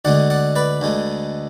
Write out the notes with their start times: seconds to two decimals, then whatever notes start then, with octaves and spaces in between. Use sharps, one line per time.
0.05 D2 D3 G#3 D5 F#5
0.30 D5 F#5
0.55 B4 D5
0.81 D2 D3 G#3